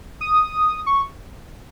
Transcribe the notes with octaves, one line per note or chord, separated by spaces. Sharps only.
D#6
C#6